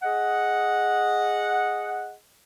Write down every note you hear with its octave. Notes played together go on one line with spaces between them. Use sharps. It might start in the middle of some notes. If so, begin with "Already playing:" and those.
G#4 D#5 F#5